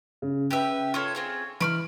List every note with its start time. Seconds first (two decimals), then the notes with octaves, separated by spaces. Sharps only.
0.22 C#3
0.51 C#3 G4 B4 E5
0.94 F4 A4 C#5 C#6
1.15 C4 F4 G#4
1.60 E3 B5 C#6 F6 D7